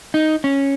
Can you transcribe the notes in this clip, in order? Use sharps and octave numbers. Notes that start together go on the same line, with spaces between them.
D#4
C#4